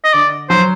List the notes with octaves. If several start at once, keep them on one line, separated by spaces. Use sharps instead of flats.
D#5
D3 D5
F#3 C5